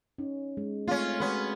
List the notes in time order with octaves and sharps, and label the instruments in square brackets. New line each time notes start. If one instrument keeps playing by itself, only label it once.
[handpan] C#4 D#4
G#3
[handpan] A3 C4 [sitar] C#4 F4
[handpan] G#3 F#4 [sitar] B3 C#4